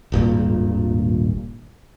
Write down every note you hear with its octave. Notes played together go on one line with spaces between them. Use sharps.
D#1 G#1 G2 A#2